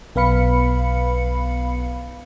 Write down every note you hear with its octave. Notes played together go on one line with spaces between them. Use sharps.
B1 B3 B4 F5 B5 C#7